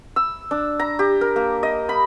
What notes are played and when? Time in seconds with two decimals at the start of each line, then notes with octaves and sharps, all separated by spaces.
0.16 E6
0.51 D4
0.79 A#5
0.99 G4
1.21 A#4
1.36 A#3
1.63 D#5
1.89 B5